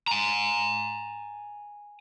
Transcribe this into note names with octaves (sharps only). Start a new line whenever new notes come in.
G#5 A#5